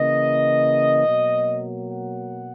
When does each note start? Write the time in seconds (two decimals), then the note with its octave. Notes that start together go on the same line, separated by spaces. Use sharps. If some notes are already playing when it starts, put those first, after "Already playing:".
Already playing: C#3 E3 A#3 D#5
1.06 B2 F#3 A#3
1.89 F#5